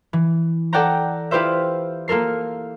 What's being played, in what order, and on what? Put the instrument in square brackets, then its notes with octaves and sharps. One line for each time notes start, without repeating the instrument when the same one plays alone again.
[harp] E3
A4 D5 F#5 G5 A#5
E4 F4 G4 B4 C5 E5
A#3 F4 A4 A#4 C7